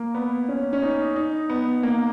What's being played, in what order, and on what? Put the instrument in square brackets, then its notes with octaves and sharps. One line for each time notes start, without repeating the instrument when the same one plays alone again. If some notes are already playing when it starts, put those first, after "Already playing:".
Already playing: [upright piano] A#3
B3
C#4
C#4
D#4
D#4
B3
A#3